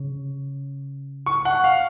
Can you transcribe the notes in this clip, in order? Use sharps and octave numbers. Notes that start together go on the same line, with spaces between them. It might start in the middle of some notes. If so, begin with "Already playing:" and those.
Already playing: C#3
C#6
F#5
F5